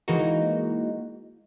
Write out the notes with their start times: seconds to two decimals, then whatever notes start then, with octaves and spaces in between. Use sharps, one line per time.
0.08 E3 G#3 A#3 D#4 F#4